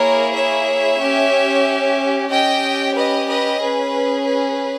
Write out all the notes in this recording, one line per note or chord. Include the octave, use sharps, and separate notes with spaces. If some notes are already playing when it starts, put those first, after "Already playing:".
Already playing: A#3 E4 G#4 A#4 C#5
C#5 E5
C#4 G4
C#4 G4 D#5 G5
B4 D#5
B4 D#5
C#4 G#4 B4
B4